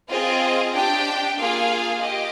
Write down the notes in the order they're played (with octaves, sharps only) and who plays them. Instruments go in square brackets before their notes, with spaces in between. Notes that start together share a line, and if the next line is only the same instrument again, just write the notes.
[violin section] C4 F4 G#4 D#5
D#5
D4 G4 G5
A#3 F4 G#4 F5
G4 D#5